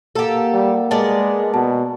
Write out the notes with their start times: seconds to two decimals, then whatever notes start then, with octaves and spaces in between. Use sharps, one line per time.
0.16 A#3 G4 A4 F#5
0.53 G3
0.91 G#3 B3 A#4 D5 A5
1.54 B2 A5